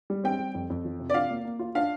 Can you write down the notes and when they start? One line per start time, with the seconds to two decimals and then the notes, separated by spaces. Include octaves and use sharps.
0.10 G3
0.24 C4 G5
0.40 G3
0.54 F2
0.70 F2
0.85 F3
0.99 C3
1.10 D5
1.14 F4 F5
1.30 A#3
1.45 A#3
1.59 F4
1.75 D4 F5